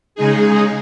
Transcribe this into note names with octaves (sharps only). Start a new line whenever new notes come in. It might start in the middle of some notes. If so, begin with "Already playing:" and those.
C#3 G#3 D#4 G#4